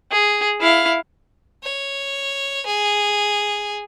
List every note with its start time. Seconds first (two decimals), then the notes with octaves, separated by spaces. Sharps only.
0.11 G#4
0.60 E4 F5
1.63 C#5
2.66 G#4